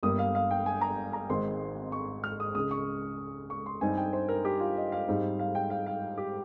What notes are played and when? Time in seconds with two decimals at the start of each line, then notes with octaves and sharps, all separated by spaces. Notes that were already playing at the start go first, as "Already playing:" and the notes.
0.03 G1 G2 G3 A#3 D#6
0.19 F5
0.35 F5
0.51 G5
0.66 G#5
0.81 A#5
1.13 A#5
1.29 G#1 G#2 D#3 G#3 C4 C6
1.92 C#6
2.24 F6
2.40 D#6
2.55 C#2 C#3 G#3 D#6
2.71 C#6
3.50 C#6
3.66 C6
3.81 G2 G3 C4 D#4 G#5
3.97 G5
4.13 C5
4.29 A#4
4.45 G4
4.60 F4
4.76 D#5
4.92 F5
5.08 G#2 G3 C4 D#4
5.39 F5
5.55 G5
5.70 F5
5.86 F5
6.17 G4